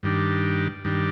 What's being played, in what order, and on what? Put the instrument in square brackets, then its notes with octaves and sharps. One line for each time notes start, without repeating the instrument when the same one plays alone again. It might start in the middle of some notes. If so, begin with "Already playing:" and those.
[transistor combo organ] G2 D#3 G3 D4
G2 D#3 G3 D4